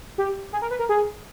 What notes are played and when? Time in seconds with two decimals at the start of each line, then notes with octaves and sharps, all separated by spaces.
0.18 G4
0.53 G#4
0.62 A#4
0.71 B4
0.79 A#4
0.89 G#4